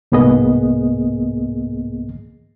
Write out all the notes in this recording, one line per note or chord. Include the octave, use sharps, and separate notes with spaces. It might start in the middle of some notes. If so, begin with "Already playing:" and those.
C2 G#2 A#3 B3 G#4 D#5